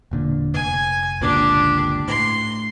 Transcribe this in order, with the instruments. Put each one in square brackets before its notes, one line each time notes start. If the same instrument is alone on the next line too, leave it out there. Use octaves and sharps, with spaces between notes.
[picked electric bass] E1 A#2 D3
[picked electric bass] F1 [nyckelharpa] G#5
[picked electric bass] G1 C#2 A#2 [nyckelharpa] D4 G4
[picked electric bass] A2 [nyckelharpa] C6